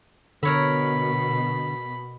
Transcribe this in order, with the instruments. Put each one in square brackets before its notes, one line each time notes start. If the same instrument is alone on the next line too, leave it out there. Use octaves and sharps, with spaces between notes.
[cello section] B2 [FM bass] D3 [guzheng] A#4 C#5 E5 [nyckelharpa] B5